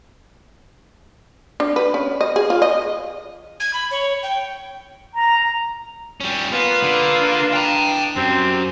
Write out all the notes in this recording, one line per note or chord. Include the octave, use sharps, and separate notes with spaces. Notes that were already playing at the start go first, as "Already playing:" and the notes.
D4
B4
C#4
D#5
G#4
F4
D#5
G#6
B5
C#5
G5
A#5
G3 C#4
A#3 B3 F4 B4
D3
D4
G5 A#5
F#2 G3 C4